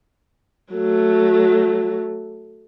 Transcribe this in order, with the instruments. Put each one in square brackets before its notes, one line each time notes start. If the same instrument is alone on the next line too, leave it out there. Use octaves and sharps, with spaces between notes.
[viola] F#3 A3